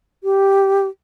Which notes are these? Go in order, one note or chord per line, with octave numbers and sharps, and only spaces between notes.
G4